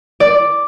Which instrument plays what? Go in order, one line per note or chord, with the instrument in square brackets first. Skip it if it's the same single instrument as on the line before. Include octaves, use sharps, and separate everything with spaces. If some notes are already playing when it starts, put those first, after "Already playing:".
[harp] D5